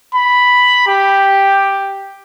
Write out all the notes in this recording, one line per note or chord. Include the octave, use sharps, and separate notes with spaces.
B5
G4